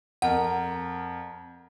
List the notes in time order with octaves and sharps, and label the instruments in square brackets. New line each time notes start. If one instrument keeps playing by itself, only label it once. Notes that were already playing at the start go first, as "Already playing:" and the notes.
[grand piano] F2 A#4 [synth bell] F#5